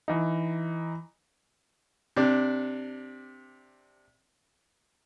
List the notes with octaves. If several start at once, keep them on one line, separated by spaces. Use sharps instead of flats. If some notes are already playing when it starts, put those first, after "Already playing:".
E3 D#4
C3 D4